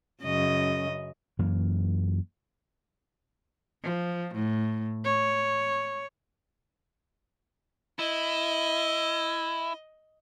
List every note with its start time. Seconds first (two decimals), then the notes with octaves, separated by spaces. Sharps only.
0.23 F#2 C#3 D#5
1.39 F#2 E3 A#3
3.83 F3
4.35 A2
5.04 C#5
7.99 E4 D#5